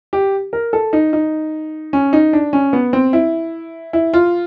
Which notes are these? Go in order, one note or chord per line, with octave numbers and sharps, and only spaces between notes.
G4
A#4
A4
D#4
D#4
C#4
D#4
D4
C#4
B3
C4
E4
E4
F4